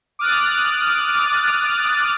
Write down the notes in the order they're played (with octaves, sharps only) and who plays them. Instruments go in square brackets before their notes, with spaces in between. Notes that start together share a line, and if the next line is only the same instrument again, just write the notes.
[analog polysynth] D6 D#6 F6 F#6 A6